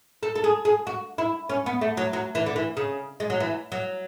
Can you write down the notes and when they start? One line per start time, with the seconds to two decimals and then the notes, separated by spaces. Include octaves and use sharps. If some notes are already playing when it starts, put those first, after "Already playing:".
0.23 A4
0.35 A4
0.44 G#4
0.65 G#4
0.87 F#4
1.18 E4
1.49 C#4
1.66 B3
1.81 A3
1.97 F#3
2.13 F#3
2.35 E3
2.46 D3
2.56 E3
2.77 C#3
3.20 G#3
3.30 F#3
3.40 E3
3.72 F#3